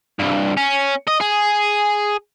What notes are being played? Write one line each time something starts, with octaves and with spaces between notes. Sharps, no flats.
C2 G2
C#4
D#5
G#4